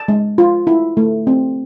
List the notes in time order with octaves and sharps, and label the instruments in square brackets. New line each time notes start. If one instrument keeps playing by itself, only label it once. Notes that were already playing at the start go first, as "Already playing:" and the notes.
Already playing: [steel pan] A5
G#3
F4
E4
A3
C4